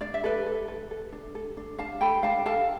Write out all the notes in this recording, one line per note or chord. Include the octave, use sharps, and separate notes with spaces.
D4 D5
E5
A4 B4 D5
A4
A4
A4
D4
A4
D4
D4 F5 A5
A4 G5 B5
D4 F5 A5
A4 F5 A5